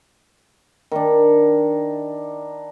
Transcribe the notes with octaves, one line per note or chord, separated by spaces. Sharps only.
D#3 D4